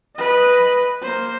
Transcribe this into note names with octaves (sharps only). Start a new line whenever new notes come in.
B4 D#5
A#3 C5